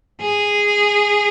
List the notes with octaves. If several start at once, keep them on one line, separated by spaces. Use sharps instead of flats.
G#4